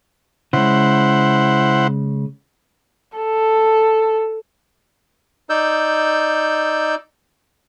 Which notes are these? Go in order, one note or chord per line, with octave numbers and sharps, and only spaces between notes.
C#3 G#3 E4 C5 F#5
A4
D#4 D5 E6 G6